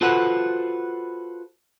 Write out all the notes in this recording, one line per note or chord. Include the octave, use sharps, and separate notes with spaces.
F4 F#4 A4 B4 C5 F#5